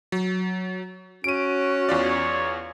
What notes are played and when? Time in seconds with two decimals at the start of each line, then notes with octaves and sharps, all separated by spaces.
0.12 F#3
1.24 C#4 F#4 D7 D#7
1.89 E2 F4 C#5 D5